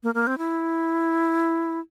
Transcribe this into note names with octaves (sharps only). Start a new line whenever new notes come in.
A#3
A#3
C4
E4